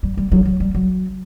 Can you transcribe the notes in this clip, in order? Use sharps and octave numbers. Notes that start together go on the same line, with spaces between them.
G3
G3
F#3
F#3
G3
F#3